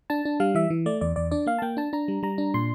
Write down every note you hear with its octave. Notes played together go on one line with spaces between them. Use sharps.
D4 A5
D4
G3 F5
E3 E5
E3
A3 D5
E2 D5
E2 D5
D4 D5
A#3 F5
A5
A#3 G5
D4 A5
D4 A#5
G3
G3 A#5
D4
A#2 C6